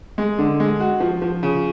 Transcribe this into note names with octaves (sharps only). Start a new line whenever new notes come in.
G#3
D3
G#3
F#4
F3
F3
C#3